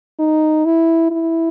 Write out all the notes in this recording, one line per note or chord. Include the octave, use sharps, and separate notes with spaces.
D#4
E4
E4